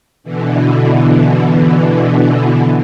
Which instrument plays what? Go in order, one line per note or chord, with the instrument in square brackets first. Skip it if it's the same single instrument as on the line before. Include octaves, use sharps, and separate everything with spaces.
[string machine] B2 D3 E3